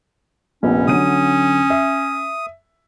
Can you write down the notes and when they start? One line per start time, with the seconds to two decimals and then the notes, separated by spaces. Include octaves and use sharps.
0.63 F1 A#1 B3 C#4
0.87 D3 F#3 D#6 D#7
1.70 E5